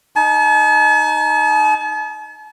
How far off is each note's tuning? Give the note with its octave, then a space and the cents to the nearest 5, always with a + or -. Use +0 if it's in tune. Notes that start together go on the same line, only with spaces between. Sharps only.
D#4 +0 A5 -45